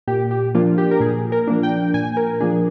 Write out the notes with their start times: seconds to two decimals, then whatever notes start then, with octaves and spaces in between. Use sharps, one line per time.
0.07 A#2 G4
0.31 G4
0.55 F3 A#3 D4 F4
0.78 G4
0.91 A#4
1.00 A#2 G#4
1.32 A#4
1.47 F3 A#3 D4
1.63 G5
1.94 A#2 G#5
2.17 A#4
2.40 F3 A#3 D4 G#4